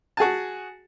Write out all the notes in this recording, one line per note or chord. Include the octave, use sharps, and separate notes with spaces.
F#4 G#4 G#5 A5